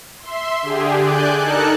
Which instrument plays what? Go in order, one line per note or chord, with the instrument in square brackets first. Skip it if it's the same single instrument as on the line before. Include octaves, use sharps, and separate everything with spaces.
[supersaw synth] E5 C6
D3 G4 G#4
D5 G#5 F#6 G6
D#4 A4 A#4 A5 F#6 C#7